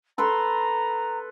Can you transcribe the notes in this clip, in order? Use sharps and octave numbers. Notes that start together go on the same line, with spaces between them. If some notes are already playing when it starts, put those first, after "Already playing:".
A4 B4 A#5 C6